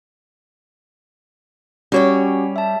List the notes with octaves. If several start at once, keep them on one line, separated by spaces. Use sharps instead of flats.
G3 C#4 F#4 G4 C#5 G5
E5 A5